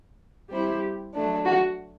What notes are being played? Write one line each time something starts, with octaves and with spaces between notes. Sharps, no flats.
G3 C4 E4 G4
F#3 A3 D4
F#4